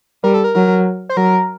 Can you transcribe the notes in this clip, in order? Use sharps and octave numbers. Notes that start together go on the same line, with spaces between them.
G3 A#4
A4
A#4
F#3 A#4
C5
F#3 A#4